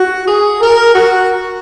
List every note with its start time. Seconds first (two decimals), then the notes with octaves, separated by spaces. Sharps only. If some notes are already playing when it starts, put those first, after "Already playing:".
Already playing: F#4
0.26 G#4
0.60 A#4
0.94 F#4